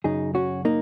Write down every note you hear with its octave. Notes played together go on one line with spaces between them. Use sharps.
F#2 C#3 D#4 G#4
C#4 F#4
A#3 D#4